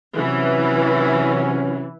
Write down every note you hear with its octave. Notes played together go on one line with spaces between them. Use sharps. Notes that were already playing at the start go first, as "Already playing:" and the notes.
C3 E3 F#3 C#4